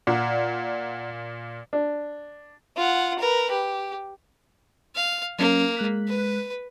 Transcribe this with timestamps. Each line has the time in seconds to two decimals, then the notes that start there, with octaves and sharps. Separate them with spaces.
0.07 A#2 D5 F#5
1.73 D4
2.77 F4 F#5
3.19 A#4 B4
3.50 G4
4.95 F5
5.39 F#3 A#3 C#4
5.77 G#3 F#6 B6
6.08 B4